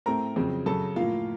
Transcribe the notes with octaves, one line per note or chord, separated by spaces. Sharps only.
A2 A3 C4 A#4 A#5
F2 C#3 F#3 C4
F#2 C#3 F#3 A4 A5
A2 F3 A#3 F4 F5